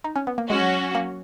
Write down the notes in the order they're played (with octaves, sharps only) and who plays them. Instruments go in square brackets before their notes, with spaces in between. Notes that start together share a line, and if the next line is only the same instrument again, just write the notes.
[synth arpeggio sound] D#4
C#4
B3
A#3
[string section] F#3 C#4 F#4 [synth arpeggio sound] G#3
[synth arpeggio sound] A#3